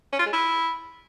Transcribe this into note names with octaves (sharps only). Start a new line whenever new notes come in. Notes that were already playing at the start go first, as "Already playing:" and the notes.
C#4
F4
G#3
E4